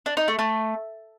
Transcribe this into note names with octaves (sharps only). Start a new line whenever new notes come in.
D4
D#4
A3
A3